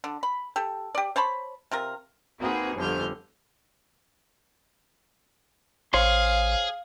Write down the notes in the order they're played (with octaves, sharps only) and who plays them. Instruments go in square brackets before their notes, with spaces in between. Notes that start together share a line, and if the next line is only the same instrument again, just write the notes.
[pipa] D3
B5
G4 A4
G4 D5
C5 C#5 A5 B5
C3 F4 A#4
[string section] A#3 C4 D#4 F#4 G#4 B4
G1 F2 D3 F3 F6 G6
[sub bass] A1 [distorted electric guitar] G#4 [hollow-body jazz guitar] C5 C#5 C6 [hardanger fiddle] F5